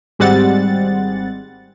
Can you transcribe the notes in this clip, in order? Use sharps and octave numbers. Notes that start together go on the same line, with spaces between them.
G#1 G3 G#3 C4 F#5 A6